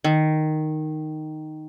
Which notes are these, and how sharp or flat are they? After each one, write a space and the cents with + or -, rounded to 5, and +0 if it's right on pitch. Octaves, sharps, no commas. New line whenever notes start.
D#3 -5